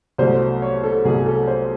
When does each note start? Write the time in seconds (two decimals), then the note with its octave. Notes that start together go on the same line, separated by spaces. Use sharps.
0.18 C2 B2 F#3 A3 C5
0.62 C#5
0.83 A4
1.05 C2 B2 F#3 A3 G#4
1.26 A4
1.48 C5